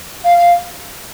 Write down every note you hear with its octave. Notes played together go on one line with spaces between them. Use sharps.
F5
F5